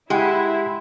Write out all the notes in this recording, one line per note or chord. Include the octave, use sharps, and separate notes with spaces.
G#3 E4 G4 F#5 G5